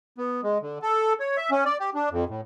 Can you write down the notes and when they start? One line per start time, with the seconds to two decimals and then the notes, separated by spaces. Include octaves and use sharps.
0.18 B3
0.43 G#3
0.62 D3
0.82 A4
1.20 C#5
1.37 E5
1.51 C#4
1.65 D5
1.79 G4
1.95 D4
2.11 F2
2.29 A2